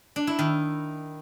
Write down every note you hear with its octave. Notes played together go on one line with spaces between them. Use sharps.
D4
E4
D#3